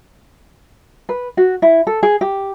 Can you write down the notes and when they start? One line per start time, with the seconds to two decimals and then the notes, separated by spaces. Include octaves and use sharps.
1.09 B4
1.37 F#4
1.62 E4
1.87 A4
2.03 G#4
2.21 G4